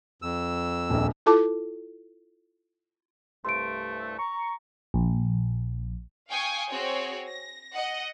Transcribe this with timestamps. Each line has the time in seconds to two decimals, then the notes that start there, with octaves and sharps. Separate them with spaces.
0.22 F2 E6
0.90 D#1 A#1
1.26 E4 F4 A4 A5 D6
3.45 C2 G2 A3 C6 D7
4.19 A#5 C#6
4.94 A#1
6.30 F5 G5 G#5 C#6 D#6
6.69 C4 F#4 G#4 C#5
7.28 A#6
7.73 D#5 F#5